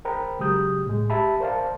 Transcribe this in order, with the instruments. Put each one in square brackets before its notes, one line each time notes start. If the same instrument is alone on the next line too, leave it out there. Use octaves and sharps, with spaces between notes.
[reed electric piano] A#4 C5 G5 A#5 B5
C#3 F#3 G#3 G4 D#6 G6
A2 G#3
G4 E5 A5 B5
A#4 C5 D5 F5 A5